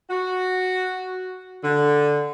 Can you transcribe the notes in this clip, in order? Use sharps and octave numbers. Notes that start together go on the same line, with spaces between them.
F#4
D3